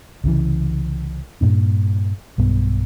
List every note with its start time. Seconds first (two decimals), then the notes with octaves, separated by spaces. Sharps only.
0.24 C2 C#3 E3
1.41 G2 A#2 D4
2.38 B1 G2 B3